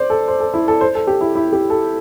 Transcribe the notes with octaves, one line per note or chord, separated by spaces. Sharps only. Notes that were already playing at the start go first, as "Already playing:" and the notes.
Already playing: C5 D5
A4
C5
A4
E4
A4
C5
A4
G4
E4
E4
G4
A4